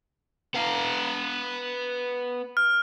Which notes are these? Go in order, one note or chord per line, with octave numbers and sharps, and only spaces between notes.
B3 F5
F6